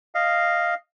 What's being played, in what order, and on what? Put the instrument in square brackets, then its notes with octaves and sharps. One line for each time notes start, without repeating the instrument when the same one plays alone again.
[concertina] D#5 F5